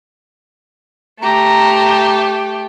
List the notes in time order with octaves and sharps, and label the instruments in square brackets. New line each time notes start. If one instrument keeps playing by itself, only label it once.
[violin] A3 G4 [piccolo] A#5